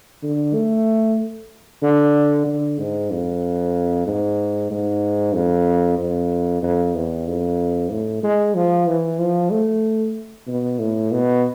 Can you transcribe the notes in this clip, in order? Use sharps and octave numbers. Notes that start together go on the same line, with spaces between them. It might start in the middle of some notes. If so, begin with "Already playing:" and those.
D3
A3
D3
D3
G#2
F2
G#2
G#2
F2
F2
F2
E2
F2
A2
G#3
F3
E3
F3
A3
B2
A2
B2